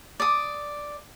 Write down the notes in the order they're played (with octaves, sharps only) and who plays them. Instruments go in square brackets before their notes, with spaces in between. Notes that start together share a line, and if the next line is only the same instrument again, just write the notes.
[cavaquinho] D5 D#6